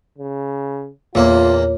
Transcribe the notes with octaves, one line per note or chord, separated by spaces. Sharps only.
C#3
E2 A#2 A#3 F4 C#5